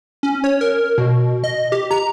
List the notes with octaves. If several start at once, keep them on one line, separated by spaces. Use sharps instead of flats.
C#4
C#5
A#4
B2
D#5
G4
A#5